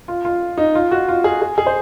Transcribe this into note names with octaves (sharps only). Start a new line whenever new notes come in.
F4
F4
D#4
F4
F#4
F4
G#4
G#4
G#4
C5